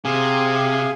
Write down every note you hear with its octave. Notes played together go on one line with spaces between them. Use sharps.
C3 G#4 F5 G#5